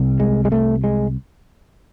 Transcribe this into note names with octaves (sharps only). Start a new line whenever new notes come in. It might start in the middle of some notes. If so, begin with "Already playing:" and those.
Already playing: C2 C3
G#3
G#3
A3
G#3